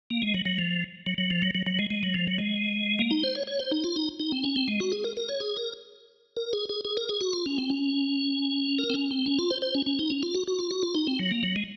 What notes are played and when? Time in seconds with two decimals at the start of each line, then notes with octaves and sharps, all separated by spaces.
0.10 A#3
0.22 G#3
0.34 F#3
0.45 F#3
0.59 F3
1.06 F#3
1.18 F#3
1.30 F3
1.42 F#3
1.55 F#3
1.66 F#3
1.79 G#3
1.90 G#3
2.03 F#3
2.14 F3
2.27 F#3
2.38 G#3
2.99 A#3
3.11 D#4
3.23 C5
3.35 C#5
3.47 C#5
3.59 C5
3.71 D#4
3.84 F4
3.96 D#4
4.20 D#4
4.32 C4
4.44 C#4
4.56 C4
4.68 G#3
4.80 F#4
4.92 G#4
5.04 A#4
5.17 A#4
5.29 C#5
5.40 G#4
5.57 A#4
6.37 A#4
6.53 G#4
6.69 G#4
6.85 G#4
6.97 A#4
7.09 G#4
7.21 F#4
7.33 F4
7.46 C#4
7.58 C4
7.70 C#4
8.78 A#4
8.90 C4
8.94 C#4
9.11 C4
9.26 C#4
9.38 F4
9.50 C5
9.62 C5
9.75 C#4
9.86 C#4
9.99 D#4
10.10 C#4
10.23 F4
10.34 F#4
10.47 F#4
10.59 F4
10.71 F#4
10.83 F4
10.95 D#4
11.07 C4
11.19 F#3
11.31 A#3
11.43 F#3
11.56 G#3